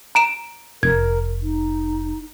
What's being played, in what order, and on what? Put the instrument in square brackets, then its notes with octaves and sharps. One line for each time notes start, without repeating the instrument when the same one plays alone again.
[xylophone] A#5 D7 E7
[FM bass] F1 [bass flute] A#4 [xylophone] G#6
[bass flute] D#4